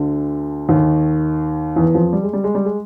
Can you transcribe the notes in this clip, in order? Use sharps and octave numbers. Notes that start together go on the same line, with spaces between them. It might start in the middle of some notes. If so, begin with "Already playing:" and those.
Already playing: D2 D3
D#2 D#3
E2 E3
F2 F3
G3
G#3
G3
G#3
G3
G#3